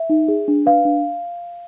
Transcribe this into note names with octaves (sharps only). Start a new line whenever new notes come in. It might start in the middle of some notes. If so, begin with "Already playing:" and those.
Already playing: E5
D#4
G#4
D4
B4 F5
D4